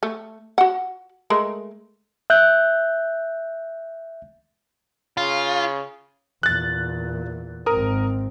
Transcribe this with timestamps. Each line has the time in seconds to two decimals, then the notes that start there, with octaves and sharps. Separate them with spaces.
0.03 A3
0.58 F#4 F#5
1.30 G#3 A3 A#4
2.30 E5 F#6 G6
5.17 C#3 F4
6.43 E2 A#2 F#6 A6
7.66 G#1 C4 A#4 D#6